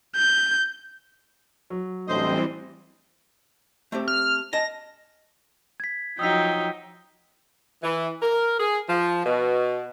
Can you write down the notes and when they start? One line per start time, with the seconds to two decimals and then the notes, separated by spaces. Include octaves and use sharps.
0.16 G6
1.70 F#3
2.08 A1 D2 E3 G3 C4 C5 D#5
3.92 A3 C4 G4
4.08 F6
4.53 D#5 G#5 A5 A#6
5.80 G#6 B6
6.19 F3 F#3 D#4 G5 D#6 E6 B6
7.83 E3
8.22 A#4
8.60 G#4
8.89 F3
9.25 B2